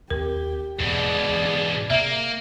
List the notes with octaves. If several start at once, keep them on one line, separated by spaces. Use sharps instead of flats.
D#2 G#3 C4 G4 A#4
E2 G#2 B2 G#4 D5
E3
C3 A#3 E5